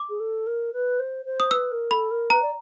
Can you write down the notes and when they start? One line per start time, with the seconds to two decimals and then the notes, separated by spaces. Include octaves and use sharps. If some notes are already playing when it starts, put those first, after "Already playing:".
Already playing: D6
0.09 G#4
0.20 A4
0.46 A#4
0.73 B4
0.99 C5
1.25 C5
1.40 D#6
1.51 B4 E6
1.71 A#4
1.91 A4 B5
2.11 A#4
2.30 B4 A#5
2.42 D5